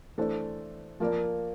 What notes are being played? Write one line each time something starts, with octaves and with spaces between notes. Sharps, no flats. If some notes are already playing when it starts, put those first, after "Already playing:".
E3 A3 D4 A4 C5
F3 A#3 F4 A#4 D5